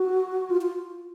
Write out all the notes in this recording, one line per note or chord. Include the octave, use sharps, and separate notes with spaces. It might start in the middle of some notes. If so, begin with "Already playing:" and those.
Already playing: F#4
F4
F4